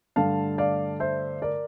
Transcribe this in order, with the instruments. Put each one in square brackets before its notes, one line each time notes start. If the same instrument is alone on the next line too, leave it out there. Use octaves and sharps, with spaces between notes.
[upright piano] G2 D3 A3 F5 A5
D5 F5
C5 E5
A#4 D5